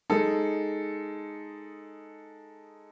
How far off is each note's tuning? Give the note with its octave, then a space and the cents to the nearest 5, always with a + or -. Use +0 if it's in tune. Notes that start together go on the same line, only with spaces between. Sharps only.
G#3 +0 D#4 +0 A4 +0